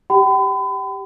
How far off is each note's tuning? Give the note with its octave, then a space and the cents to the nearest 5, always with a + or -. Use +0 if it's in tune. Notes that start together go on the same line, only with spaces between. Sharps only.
G4 +0 G5 -40 B5 +35